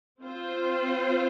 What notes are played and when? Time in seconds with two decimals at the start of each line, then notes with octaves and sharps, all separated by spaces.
0.22 C4 F4 C5